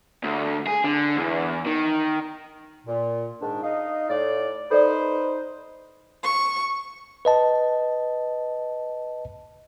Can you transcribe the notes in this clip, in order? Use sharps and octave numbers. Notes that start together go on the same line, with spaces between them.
D2
G#4
D3
E2
D#3
A#2
G#2 D#3 D4
D#4 D#5 F5
A2 D5
D#4 A4 B4 C5 D5
C#6
B4 D#5 A5